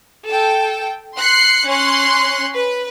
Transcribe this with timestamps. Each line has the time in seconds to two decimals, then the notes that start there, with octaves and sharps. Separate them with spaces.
0.27 A4 G5
1.17 C6 F#6 C7 C#7
1.68 C#4 C6 F#6 C#7
2.54 B4